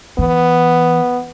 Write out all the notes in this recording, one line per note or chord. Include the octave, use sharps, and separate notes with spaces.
E3 B3